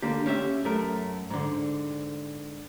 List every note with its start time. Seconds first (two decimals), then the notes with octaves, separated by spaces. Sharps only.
0.02 D3 A#3 G4
0.26 C#4 G4 E5
0.64 F#2 A3 A#4
1.30 G#2 D3